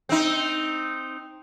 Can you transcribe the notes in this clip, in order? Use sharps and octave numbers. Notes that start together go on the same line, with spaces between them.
C4 D#4